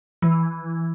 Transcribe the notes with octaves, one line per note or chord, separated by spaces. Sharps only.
E3